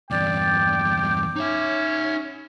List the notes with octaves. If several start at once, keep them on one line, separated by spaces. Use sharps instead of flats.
E2 G2 D5 G5 D6
C#4 D#4 C#5 E5